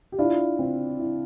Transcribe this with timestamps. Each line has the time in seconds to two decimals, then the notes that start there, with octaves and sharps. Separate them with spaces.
0.12 G4
0.18 D4 E4 F4
0.59 C4
0.99 E4